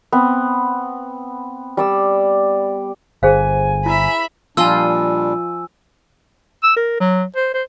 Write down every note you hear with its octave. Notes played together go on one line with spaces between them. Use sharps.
B3 C4
G3 D5 E6
G1 G#4 C5 F5 G#5
E4 E5 B5
A#2 F3 G3 D4 F4 D#5 G#5 E6
E6
A#4
F#3
C5
C5